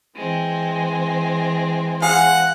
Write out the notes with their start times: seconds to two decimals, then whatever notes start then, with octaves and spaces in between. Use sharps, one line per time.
0.16 E3 G#3 C4
2.02 G#4 F5 F#5